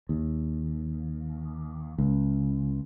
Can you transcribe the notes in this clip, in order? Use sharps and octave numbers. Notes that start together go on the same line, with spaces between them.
D#2
C#2